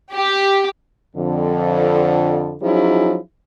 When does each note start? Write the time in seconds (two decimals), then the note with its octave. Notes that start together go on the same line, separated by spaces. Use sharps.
0.13 G4
1.16 F2 D3
2.62 F3 F#3 C#4 D#4 E4 G#4